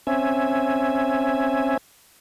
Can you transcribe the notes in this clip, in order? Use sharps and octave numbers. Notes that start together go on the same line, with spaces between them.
C4 C#4 E5 G#5